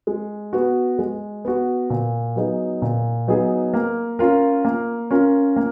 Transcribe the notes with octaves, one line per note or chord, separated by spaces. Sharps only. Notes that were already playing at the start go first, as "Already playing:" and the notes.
G#3
B3 F#4
G#3
B3 F#4
A#2
F#3 B3 D#4 G#4
A#2
F#3 B3 D#4 G#4
A#3
C#4 F4 A#4
A#3
C#4 F4 A#4
A#3